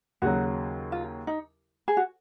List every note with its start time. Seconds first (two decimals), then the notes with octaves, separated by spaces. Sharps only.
0.22 D#2 C#3 F#3 F#4
0.92 F4
1.27 D#4
1.88 G#4
1.97 F#4